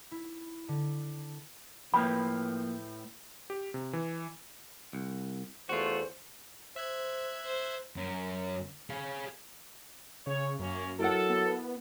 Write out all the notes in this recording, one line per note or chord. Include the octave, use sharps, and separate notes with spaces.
E4
D3
A2 F3 A#3 B4 G5 B5
G4
C3
E3
C2
E2 A3 F4 F#4 C5
C5 E5 F#6 G#6
C5
F#2
G#4 F5
C#3 C#5
F#2 A#3 C#4
F#3 E4 A4 A#4 F#5
B3